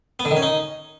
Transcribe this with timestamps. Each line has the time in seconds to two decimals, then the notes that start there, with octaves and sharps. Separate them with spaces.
0.20 B3
0.25 D3
0.31 D#3
0.37 C#4
0.42 D#4